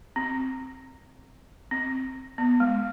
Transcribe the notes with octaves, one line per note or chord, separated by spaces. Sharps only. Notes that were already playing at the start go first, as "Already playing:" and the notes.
C4
C4
B3
G#3